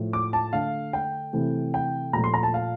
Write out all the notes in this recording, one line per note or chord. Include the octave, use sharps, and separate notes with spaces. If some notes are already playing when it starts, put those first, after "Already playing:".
Already playing: A2 F3 A3
D6
A5
D3 A3 F5
G5
C3 E3 A3
G5
A#2 F3 A3 A#5
C6
A#5
A5
F5